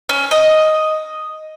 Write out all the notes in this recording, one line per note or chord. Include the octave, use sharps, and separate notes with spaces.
C#4
D#5